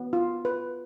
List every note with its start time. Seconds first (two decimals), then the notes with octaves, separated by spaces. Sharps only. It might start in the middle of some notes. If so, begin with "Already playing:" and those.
Already playing: B3
0.13 F4
0.45 B4